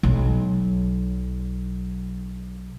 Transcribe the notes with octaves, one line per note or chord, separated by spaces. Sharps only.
B1 F#3